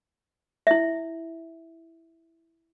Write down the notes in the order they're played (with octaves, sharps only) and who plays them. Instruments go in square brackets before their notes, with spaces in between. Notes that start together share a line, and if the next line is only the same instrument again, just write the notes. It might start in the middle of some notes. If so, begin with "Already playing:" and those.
[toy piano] E4 E5